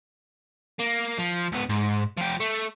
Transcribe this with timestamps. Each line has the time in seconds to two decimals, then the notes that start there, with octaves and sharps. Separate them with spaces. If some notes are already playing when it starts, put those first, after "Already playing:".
0.80 A#3
1.19 F3
1.52 C#2 B3
1.69 G#2
2.17 F3 G4
2.40 A3